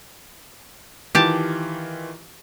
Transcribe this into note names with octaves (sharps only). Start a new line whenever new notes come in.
D#3 E3 F4 G4 A5